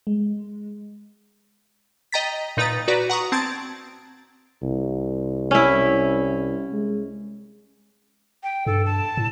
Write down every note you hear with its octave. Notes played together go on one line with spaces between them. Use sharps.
G#3
D#5 G5 A#5 A6 B6
A#2 D#4 B4 A#5 A6
F#4 B4 D5 A#5 B6
F#5 A#5 C#6 D#6
C4 A5 G#6 A6 D7
C2
C#4 E4
G#3
G5
G2 A4
A5
A2